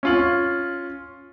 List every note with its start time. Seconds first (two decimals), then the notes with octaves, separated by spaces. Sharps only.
0.03 C#4 F4 F#7